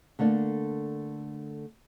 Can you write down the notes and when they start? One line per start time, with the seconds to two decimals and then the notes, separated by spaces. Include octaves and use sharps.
0.19 D3 A3 A#3 D4